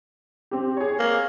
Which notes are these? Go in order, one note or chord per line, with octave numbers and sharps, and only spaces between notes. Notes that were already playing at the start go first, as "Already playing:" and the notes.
C4 G4
G#4 C#5
A#3